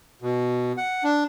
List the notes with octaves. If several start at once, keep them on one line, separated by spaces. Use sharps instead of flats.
B2
F#5
D4